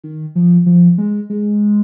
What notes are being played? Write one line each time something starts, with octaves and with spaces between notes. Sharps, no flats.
D#3
F3
F3
G#3
G#3